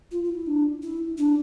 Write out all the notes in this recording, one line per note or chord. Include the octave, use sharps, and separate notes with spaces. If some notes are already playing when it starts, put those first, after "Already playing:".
F4
F4
E4
D4
E4
D4